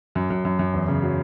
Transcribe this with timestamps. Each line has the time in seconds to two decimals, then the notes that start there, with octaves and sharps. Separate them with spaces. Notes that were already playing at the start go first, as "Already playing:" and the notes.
0.15 F#2
0.30 F#2
0.45 F#2
0.59 F#2
0.74 E2
0.88 C#3
1.02 F#3